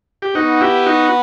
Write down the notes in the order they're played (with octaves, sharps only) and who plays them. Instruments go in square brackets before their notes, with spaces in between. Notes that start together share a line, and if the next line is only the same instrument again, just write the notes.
[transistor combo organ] G4
[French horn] B3 [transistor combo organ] D#4 F#4
[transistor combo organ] E4 G4
D#4 F#4